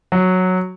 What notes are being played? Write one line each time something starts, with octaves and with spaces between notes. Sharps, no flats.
F#3